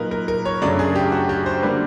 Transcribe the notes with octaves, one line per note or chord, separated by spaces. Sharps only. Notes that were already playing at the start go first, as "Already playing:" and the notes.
Already playing: A#2 F#3 A#3 D#4 A#4 B4
A#4
A#4
C#5
F#2 C#3 F#3 A3 D4 D5
G#4
G4
F#4
G4
C5
D3 G3 A#3 D4 B4